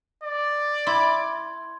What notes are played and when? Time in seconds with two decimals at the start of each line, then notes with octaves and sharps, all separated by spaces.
0.23 D5
0.87 E4 C6 G#6